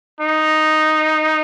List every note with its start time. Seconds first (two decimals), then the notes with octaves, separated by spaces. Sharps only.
0.21 D#4